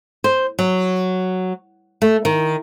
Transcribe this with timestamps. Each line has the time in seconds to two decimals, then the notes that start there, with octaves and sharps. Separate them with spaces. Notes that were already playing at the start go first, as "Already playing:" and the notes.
0.24 C5
0.59 F#3
2.02 A3
2.25 D#3